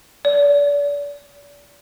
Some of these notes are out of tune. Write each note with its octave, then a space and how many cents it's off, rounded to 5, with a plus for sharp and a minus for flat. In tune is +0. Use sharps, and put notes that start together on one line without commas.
D5 -35